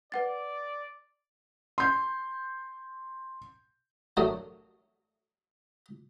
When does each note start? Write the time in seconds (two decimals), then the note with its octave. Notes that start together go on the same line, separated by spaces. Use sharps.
0.12 B4 D5 F#5 A6
1.78 C6 G6
4.17 D3 F#3 A3 A#4 D#6